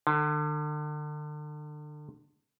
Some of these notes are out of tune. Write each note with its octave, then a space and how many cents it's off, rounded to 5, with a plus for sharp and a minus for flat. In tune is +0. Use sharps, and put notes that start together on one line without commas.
D3 +35